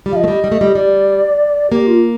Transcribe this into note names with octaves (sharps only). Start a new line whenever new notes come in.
G3
F3 D#5 F5
A3
G3
G3
A3
G3
G3 D5
A#3 G4
F4